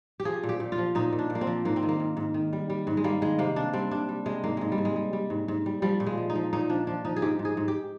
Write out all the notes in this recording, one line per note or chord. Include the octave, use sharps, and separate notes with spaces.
G4
F3 G#4
A#2
G4
A#2
F4
F3
A#2 D#4
A#2
D4
A#2
A#3
C4
F3
G#2 A#3
C4
D#3
A#3
G#2
G#2
D#3
G3
G3
G#2
G#3
G3 A#3
D#3 G#3
C3 A#3
C3 D4
G3 C4
C3 D4
G3
C3 G#3
G#2 A#3
G#2 G#3
G3
G#2
G#3
G3
G3
G#2
G#2
G3
F3 G3
A#2
G#3
F3
D#4
F3
A#2 D#4
F3 D4
F3 D4
F3 D#4
G#4
G#2 G4
G#2
G#4
G#2
G4